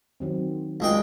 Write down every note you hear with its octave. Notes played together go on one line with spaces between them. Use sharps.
D#3 F#3 C4
C#2 G#3 D4 F#4 G5